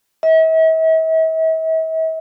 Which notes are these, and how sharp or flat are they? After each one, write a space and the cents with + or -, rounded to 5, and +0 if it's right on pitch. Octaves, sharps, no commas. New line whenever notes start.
E5 -45